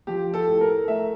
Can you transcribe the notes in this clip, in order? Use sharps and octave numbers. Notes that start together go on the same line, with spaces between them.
F3 G4
A4
A2
A#4
A3 E5